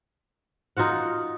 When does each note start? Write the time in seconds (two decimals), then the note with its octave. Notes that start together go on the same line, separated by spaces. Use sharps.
0.77 D#4 F4 F#4 F#5